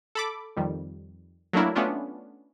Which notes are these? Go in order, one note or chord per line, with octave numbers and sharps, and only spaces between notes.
A4 B5 D6
F2 D#3 G3
F#3 A3 A#3 D4 E4 A#4
A3 B3 C#4 D4 F4